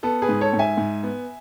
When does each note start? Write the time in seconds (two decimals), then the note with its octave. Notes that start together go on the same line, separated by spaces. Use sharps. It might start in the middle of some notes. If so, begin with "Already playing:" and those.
0.03 B3 A4
0.22 G#4 B4
0.29 G#2
0.41 A4 C#5
0.53 G#2
0.59 E5 G#5
0.77 G#2
1.03 B3